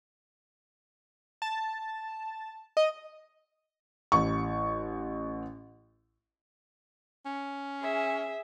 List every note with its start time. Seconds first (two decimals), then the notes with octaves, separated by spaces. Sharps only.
1.42 A5
2.77 D#5
4.12 A1 C#6
7.26 C#4
7.80 G#4 E5